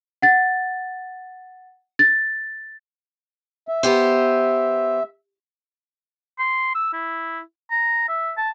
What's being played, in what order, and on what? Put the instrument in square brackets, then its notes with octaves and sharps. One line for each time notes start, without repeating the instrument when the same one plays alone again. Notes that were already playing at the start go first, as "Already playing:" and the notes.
[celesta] F#5 A6
A6
[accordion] E5
[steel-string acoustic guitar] B3 G4 C5
[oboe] C6
E6
E4
A#5
E5
A5